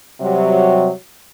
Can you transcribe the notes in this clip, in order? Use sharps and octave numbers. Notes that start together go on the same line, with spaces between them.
C3 F#3 G3